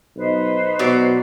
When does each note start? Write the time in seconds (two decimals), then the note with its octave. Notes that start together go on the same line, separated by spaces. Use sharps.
0.16 B1 D#4 B4 C5
0.79 B2 F#3 D5